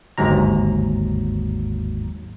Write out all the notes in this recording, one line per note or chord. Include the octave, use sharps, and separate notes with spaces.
G1 D#2 G#2 F#3 A#5